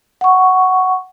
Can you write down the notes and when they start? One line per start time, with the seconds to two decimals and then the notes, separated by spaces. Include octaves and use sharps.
0.21 F#5 C#6